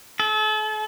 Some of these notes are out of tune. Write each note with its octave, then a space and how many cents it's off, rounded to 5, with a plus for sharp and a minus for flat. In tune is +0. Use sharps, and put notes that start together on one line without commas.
A4 -40